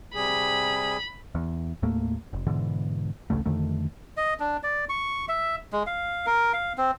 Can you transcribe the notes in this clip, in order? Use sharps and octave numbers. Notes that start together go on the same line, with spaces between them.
C3 G3 G#4 B5
E2
D#2 A2 A3 A#3
F1
G#2 B2 D3 E3
A1 D2 C#3 A3
F2 D3 D#3 A3
D#5
D4
D5
C#6
E5
G#3
F5
A#4
F5
C4